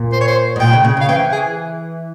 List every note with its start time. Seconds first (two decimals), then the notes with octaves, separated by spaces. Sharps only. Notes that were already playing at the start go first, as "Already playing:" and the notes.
Already playing: A#2
0.12 C5
0.21 C#5
0.27 C5
0.56 G#2
0.60 A#2 G5
0.73 C#3
0.85 C#3
0.97 C#3 F5
1.08 E3 G5
1.32 G#4